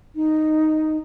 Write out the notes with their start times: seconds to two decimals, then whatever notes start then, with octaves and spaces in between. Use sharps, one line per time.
0.15 D#4